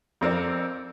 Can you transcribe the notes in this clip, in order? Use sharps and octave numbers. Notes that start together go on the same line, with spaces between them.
F2 C4 A#4 D5